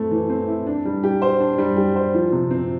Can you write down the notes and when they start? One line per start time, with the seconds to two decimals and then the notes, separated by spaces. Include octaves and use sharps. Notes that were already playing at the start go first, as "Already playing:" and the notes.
Already playing: A3 C4 E4
0.11 E3
0.30 C4
0.48 E4
0.67 D4
0.85 G3
1.04 G4
1.22 C5
1.40 D4
1.58 G3
1.77 G4
1.96 C5
2.14 F3
2.32 C3
2.51 C4